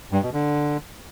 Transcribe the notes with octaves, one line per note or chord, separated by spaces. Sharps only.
G2
B2
D3